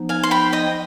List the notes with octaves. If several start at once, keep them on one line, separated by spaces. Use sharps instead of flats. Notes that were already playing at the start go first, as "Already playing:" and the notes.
Already playing: F3 B3 D#4
F5 G#5
C6
G5 B5
D#5 G5